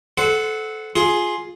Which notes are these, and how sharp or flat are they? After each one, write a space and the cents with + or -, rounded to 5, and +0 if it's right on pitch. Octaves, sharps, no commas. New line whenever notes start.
A4 -20 C5 -25 F#5 +0
F4 +10 G#4 +10